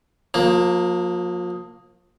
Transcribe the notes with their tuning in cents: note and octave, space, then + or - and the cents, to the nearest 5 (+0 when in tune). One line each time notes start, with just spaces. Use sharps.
F3 +35 A#3 +0